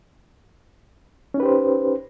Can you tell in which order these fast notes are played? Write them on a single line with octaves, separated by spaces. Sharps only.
C#4 D#4 B4 G4 C5